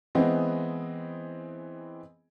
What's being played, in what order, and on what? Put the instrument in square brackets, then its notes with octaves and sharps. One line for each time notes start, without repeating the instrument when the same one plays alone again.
[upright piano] E3 G#3 B3 C4 G#4 D#5